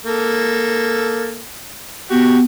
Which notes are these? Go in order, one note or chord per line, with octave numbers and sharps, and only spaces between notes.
A#3 A4
B3 F#4 G4